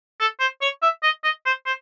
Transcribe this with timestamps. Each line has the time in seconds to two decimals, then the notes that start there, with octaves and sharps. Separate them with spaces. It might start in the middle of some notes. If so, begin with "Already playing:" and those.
0.20 A4
0.40 C5
0.62 C#5
0.82 E5
1.03 D#5
1.24 D#5
1.46 C5
1.66 C5